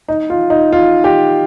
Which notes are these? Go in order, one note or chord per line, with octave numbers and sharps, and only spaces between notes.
D#4
F4
D#4
F4
G4